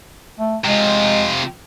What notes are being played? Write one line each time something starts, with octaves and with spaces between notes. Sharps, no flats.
A3
C3 G#3 F4